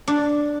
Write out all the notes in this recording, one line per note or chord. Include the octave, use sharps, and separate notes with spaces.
D4